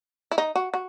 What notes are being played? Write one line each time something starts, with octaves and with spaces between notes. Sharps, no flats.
E4
D#4
F#4
F#4